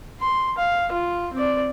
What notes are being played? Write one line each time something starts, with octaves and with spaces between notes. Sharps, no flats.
C6
F5
F4
C4 D5